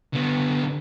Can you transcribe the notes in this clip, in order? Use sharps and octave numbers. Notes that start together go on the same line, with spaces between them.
D3 B3